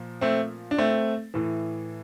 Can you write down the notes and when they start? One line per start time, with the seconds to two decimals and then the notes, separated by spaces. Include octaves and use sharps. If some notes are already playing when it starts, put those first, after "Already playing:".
Already playing: A#2 F3
0.21 A3 C4
0.71 D4
0.78 A3 C4
1.34 A2 E3